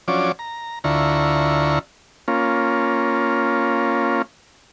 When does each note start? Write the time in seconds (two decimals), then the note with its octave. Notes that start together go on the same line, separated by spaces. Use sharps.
0.08 F3 F#3 C#4 D4 D6
0.39 A#5
0.84 D2 D3 E4 F4 A#5 C#6
2.28 A#3 C#4 F4